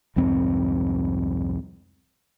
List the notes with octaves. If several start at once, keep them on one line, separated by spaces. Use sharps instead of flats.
C2 F2 G#2 C4